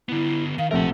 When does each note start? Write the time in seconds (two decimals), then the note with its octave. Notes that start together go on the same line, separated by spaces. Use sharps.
0.09 D3 B3 E4
0.58 D#3 F5
0.71 A#1 C3 F3 A3 A#4 F#5